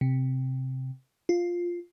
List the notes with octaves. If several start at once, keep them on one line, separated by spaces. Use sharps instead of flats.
C3
F4